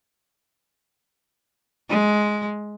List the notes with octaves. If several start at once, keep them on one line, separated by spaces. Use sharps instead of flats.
G#3